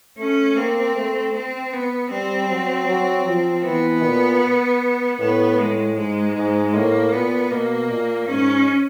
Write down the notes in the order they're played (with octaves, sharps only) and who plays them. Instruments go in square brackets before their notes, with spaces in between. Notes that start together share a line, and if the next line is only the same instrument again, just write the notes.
[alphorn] A3 [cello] C#4
[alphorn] A#3 [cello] C4
[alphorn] A3
[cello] C4
B3
[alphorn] G3 [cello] C4
[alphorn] F#3
F#3
F3
[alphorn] E3 [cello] B3
[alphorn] A#2
[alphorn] A2 [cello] B3
[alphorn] A2 [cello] G#3
[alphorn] G#2 [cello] G#3
[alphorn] G#2
[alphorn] A2 [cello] A#3
[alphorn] A#2 [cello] B3
[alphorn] B2 [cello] A#3
[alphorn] A#2
[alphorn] G#2 [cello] C#4